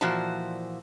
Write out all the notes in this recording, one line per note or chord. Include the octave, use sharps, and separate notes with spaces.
A#2 E3 F3 F#4 C5 A5